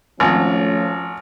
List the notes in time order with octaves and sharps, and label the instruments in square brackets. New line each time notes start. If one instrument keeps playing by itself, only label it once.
[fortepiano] G#1 [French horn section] F3 A3 C#4